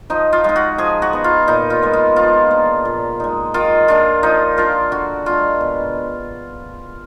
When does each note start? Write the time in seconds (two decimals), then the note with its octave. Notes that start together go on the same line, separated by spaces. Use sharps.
0.10 F3 D#4
0.33 F4
0.44 G#3 D#4
0.56 F#4
0.78 F3 G#4
1.02 F#4
1.13 B3 D#4
1.24 F4
1.47 A#2 D#4
1.70 F4
1.82 G#3 B3
1.93 F4
2.16 F3 F4
2.51 A#3 D4
2.85 A#2
3.20 G#3 D#4
3.54 D#3 F4
3.88 A#3 D4 F4
4.23 F3 D#4
4.57 A#3 D4 F4
4.92 D3 F#4
5.26 G#3 D4 F4
5.61 B2